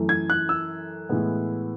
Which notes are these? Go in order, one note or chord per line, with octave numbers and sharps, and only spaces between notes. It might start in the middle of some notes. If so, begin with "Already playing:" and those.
Already playing: F#2 E3 A3
G#6
F#6
E6
A2 E3 G#3 B3